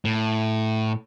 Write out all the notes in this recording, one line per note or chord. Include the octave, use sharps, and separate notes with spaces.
A2